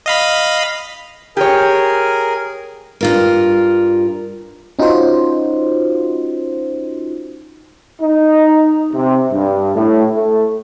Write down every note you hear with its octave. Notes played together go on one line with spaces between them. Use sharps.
D#5 F5 B5
G4 G#4 A#4 C#5 G#5
G2 F4 A#4
C#4 D#4 F4 F#4 C5
D#4
C3
G2
A2
A3